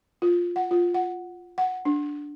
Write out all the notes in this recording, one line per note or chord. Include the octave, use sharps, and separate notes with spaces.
F4
F#5
F4
F#5
F#5
D4